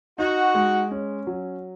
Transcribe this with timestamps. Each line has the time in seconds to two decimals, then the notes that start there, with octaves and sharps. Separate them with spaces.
0.18 D#4 F#4
0.55 G#3
0.91 C#4
1.27 F#3